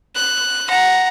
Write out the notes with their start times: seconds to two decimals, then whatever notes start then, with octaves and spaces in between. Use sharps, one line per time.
0.15 F#6
0.68 F#5 A#5